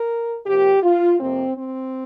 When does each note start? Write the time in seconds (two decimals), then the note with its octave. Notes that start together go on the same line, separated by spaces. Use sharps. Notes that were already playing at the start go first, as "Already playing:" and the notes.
Already playing: A#4
0.46 C3 F3 A#3 G4
0.83 F4
1.19 F2 C3 A#3 C4
1.56 C4